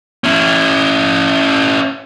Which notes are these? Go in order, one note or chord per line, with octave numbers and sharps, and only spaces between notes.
C#4 E4